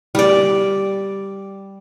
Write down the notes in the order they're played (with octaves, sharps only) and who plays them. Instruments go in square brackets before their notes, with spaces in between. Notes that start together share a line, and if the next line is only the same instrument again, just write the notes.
[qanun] G3 D5